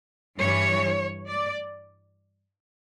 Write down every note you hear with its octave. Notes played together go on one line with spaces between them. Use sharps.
G2 E3 G3 C#5
D5